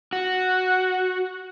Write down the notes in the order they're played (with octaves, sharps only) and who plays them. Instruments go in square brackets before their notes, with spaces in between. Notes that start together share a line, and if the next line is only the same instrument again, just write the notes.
[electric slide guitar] F#4